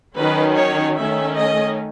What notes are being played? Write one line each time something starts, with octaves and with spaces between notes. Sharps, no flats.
D#3 F#3 C#4 B4
C#5
D#3 A3 C#4 E5
D#5